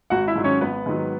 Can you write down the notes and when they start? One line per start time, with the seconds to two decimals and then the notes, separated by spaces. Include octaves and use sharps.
0.10 G#1 F#4 F#5
0.27 E4 E5
0.36 G#2 D#3 F#3
0.44 C#4 C#5
0.61 G#1 B3 B4
0.86 G#2 D#3 F#3